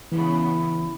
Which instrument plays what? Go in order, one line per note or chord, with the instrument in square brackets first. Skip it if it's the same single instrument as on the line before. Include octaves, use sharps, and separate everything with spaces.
[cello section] C#3 B3 [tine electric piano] E3 [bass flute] E4